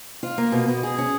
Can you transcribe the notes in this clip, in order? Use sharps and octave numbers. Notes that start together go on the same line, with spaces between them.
F4
A#3
B2
B2
G#4
C#4